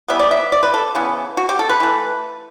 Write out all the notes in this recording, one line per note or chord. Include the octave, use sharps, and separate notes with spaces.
E3 G3 B3 E5
D5
E5
D5
B4
A4
C#3 E3 B3
F#4
G4
A4
B4
E3 A3